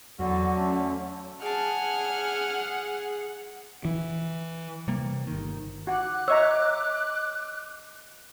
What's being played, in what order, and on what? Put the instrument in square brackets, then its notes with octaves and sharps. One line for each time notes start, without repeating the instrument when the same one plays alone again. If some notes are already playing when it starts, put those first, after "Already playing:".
[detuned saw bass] E2 [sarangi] D3 [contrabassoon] F#3 [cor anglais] F#4
[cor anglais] A3 [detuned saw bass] C#4
[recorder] G#4 [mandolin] D5 A5 [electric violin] F#5 [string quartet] G#5 F6
[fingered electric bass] E3
[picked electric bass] C3 G3 A#3
G1 D#3
[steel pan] F#4 F#5 [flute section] D6 F#6
[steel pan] C#5 E5 A#5 [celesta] D#5 E6